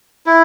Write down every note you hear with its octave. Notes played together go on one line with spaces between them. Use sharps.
E4